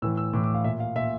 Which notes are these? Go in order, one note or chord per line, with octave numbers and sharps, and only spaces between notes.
A2 E3 E6
E6
A2 E3 D6
D6
F5
A#2 E5
F5
A#2 E5